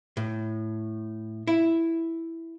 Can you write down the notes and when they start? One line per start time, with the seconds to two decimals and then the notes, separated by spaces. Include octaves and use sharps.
0.17 A2
1.47 E4